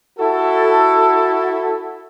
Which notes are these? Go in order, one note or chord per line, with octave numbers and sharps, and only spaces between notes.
E4 F#4 A4